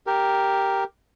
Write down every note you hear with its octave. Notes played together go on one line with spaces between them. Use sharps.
G4 A#4